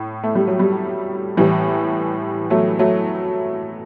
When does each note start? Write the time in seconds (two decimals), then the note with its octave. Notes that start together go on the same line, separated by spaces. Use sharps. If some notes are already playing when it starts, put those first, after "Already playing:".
Already playing: A2
0.23 A3
0.35 G3
0.47 F#3
0.59 G3
1.37 A2 E3 G3
2.50 F#3 A3
2.79 F#3 A3